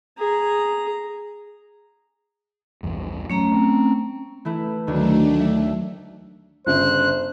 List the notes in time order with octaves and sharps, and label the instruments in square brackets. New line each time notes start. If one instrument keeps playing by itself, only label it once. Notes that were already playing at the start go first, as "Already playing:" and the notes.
[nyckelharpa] G#4 A#5
[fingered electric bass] A#1 E2 G2
[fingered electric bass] F#3 [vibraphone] A3 C#4 A#5
[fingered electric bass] C4
[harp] E3 A3 E4
[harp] D2 D#3 [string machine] F#3 A3 D4
[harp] E5
[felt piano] G1 C#3 E5 [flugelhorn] C5 [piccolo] F#6